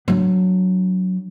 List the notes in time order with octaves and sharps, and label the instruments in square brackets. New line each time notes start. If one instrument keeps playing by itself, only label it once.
[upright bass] F#3 D4